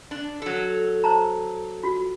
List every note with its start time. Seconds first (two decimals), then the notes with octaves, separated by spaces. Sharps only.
0.11 D4
0.42 F#3 A4
1.04 C5 A5 A#5
1.83 F4 F#4